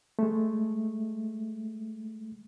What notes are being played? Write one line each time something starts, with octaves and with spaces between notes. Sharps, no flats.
G#3 A3